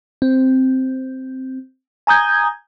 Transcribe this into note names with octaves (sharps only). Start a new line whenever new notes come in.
C4
G#5 A#5 D#6 G6 G#6